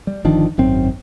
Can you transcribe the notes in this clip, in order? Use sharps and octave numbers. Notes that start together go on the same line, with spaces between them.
G3
G1 D#3 F3 D4
G#1 F#2 C4